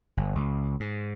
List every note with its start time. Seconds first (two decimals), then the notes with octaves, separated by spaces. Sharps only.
0.17 G1
0.35 C#2
0.80 G#2